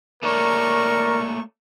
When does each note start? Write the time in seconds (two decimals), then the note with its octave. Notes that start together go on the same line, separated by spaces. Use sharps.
0.23 A3 A#3 A#4 C#5 D5 C#6